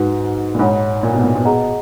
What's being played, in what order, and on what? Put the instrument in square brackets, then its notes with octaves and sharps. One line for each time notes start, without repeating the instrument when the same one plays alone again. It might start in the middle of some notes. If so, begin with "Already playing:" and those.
Already playing: [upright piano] G#2 [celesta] D#4 F#4 B4 F#5
[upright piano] A#2
[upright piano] G#2 [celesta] C#5 F#5 B5
[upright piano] A#2
B2
A#2
B2
[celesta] G#4 D#5 F#5 A#5